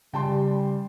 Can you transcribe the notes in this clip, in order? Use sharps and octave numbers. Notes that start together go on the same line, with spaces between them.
C#3 G3 G5 A5 C6